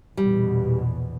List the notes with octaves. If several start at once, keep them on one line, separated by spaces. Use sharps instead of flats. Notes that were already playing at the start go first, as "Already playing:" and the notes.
A#1 E2 B2 G3